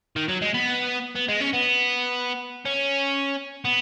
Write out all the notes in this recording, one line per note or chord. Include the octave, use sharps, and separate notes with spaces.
D#3
F#3
G#3
B3
B3
G#3
C#4
B3
C#4
B3